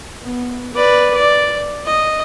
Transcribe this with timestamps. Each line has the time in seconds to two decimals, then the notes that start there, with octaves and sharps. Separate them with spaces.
0.23 B3
0.74 B4 D5
1.14 D5
1.85 D#5